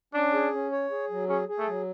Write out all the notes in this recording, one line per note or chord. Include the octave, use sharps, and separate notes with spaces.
C#4 D4
G#4
C#4
C#5
G#4
F#3
C#4 G#4
G#4
A3
F#3